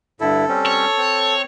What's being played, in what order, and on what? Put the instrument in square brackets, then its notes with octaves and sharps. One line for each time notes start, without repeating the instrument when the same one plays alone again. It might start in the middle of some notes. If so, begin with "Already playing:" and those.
[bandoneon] G2 D3 E4 [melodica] A4
[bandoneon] G3 C4 C#4
[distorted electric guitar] C#5
[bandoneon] C4